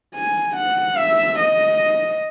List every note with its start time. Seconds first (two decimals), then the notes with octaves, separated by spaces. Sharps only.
0.15 G#5
0.57 F#5
0.97 E5
1.40 D#5